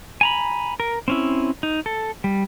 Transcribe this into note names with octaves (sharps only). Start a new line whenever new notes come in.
G#5 A#5 B5
A#4
C4 C#4 E4
D#4
A4
G3